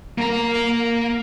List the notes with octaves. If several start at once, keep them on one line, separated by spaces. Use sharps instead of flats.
A#3 A#5